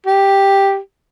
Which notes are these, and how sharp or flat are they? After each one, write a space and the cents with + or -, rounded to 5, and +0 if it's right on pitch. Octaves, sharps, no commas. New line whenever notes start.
G4 +0